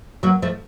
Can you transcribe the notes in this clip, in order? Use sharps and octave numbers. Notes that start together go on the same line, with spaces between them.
F#3 A#3
F3 A3